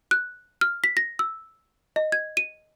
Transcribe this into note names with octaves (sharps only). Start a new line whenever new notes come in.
F#6
F6
B6
A#6
E6
D#5
G#6
D#7